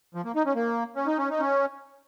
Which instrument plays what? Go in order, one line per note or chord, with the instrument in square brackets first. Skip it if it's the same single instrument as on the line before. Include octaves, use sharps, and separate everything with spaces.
[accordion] F3
A#3
D#4
C#4
A#3
C#4
D#4
C#4
D#4
C#4